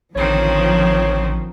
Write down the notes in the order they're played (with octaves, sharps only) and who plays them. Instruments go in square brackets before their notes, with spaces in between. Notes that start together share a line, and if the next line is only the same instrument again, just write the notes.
[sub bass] A1 [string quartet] D3 D#3 C4 [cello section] F3 [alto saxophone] C#5